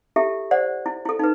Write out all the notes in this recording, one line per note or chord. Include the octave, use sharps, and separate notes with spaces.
E4 G4 A4 E5
C5 D5 F#5
E4
E4 A4
D#4 B4